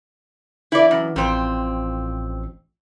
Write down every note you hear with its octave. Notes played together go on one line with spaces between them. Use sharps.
E3 E4 D5
F#2
A1 F2 C4